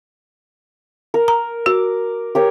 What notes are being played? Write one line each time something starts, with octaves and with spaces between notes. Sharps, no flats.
A#4
A#5
F#4 D6
G4 A#4 C#5